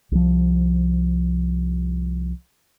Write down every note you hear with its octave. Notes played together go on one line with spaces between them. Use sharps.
C2 F3